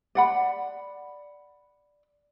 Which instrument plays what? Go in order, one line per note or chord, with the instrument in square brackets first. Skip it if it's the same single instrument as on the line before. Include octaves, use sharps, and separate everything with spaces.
[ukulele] D5 F#5 B5